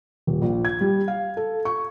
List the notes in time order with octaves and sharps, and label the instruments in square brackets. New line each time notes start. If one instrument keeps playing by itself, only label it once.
[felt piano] D#1
A#1
G#6
G3
F5
A4
C#6